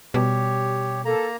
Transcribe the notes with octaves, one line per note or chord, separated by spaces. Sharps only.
B2 G3 G4 C#5
A#3 A4 A#5